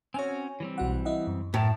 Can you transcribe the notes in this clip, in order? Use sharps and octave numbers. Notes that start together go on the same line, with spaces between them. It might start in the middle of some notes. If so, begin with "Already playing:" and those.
C4 C#4 F#4 C#5 G#5
E3 G3 C4
B1 F#4 F#5
E4 D#5 F#5
F#2
A2 B3 A#4 A5